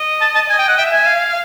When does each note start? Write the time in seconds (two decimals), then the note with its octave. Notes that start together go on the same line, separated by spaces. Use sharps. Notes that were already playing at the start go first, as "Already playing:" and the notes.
Already playing: D#5
0.21 A5
0.35 A5
0.49 D#5 G#5
0.59 G5
0.68 F#5
0.78 E5 G5
0.91 G#5
1.06 F5